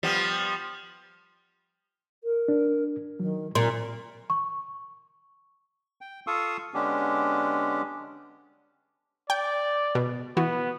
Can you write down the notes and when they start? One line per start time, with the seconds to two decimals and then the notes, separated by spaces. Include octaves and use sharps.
0.03 F3 G3 B3
2.24 A#4
2.48 D4
3.20 D#3 F#3
3.55 A#2 C4 C6
4.30 C#6
6.01 G5
6.27 F4 A4 F5 C#6 D#6 E6
6.74 D3 G#3 B3 C#4 D4 G4
9.30 D5 G5
9.95 B2
10.37 E3 B3 F#4